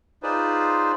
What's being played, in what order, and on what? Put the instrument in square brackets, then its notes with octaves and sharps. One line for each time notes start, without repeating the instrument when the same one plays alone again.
[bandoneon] D#4 F4 G#4 B4 C5 D5